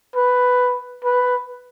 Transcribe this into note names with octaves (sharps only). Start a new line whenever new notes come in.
B4
B4